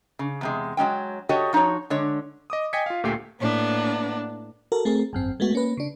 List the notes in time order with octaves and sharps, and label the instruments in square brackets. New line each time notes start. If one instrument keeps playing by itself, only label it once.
[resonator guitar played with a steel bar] C#3
E2 C3 G#3
F#3 G#3 C#4 G5
F#4 G4 A4 C#5 D#5
F3 D#4 F4 F#4 C#5
D3 G#3 C#5
[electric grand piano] D#5 D6 D#6
D#5 G5 G#5 G#6 B6 C#7
F4 F5
D2 A#2 A3 G4 G5 C7
[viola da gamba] A2 [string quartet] A#3 B3 D4
[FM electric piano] F#4 A4 A#4
A3 C4 G#4 A#4
G#1 F#2 C4
G#3 A3 B3 F#4
A#3 C#4 B4
C#3 D4